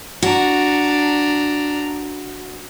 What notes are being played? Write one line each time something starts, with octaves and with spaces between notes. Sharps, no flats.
D4 F#4 A#5